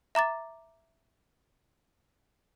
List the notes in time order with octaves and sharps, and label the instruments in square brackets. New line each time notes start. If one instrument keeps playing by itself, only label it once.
[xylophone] E5 A#5 D6 A6